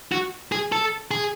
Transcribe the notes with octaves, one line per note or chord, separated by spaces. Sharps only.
F#4
G#4
A4
G#4